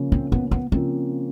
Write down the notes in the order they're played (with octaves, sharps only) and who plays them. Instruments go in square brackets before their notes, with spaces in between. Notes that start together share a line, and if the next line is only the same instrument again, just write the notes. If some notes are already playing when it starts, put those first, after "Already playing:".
Already playing: [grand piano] C#3 F3 A#3 C#4 F4
[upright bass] C4
B3
B3
[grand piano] C#3 F3 A#3 C#4 F4 [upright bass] C4